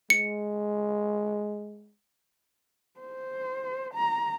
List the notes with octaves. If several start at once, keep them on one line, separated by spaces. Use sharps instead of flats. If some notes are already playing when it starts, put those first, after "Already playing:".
G#3 C#7
C5
A#5